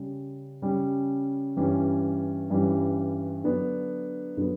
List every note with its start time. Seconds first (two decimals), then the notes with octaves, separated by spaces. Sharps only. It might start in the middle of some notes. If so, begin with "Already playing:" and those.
Already playing: C#3 G3 C#4
0.62 C#3 G3 C#4
1.57 G2 E3 G3 C#4
2.50 G2 E3 G3 C#4
3.44 D3 F#3 B3 D4
4.37 D3 F#3 B3